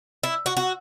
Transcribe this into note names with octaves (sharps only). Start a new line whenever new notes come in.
E4
F#4
F#4